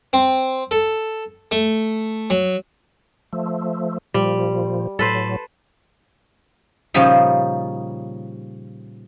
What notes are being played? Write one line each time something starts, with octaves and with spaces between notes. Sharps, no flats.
C4
A4
A3
F#3
F3 A3
A#2 F3 G3
A2 F#3 A4 B4 C5
A#2 C#3 F3 G3 D#4